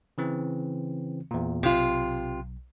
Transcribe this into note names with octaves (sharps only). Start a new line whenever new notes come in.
C#3 E3 C4
E2 A#2
B1 C3 F4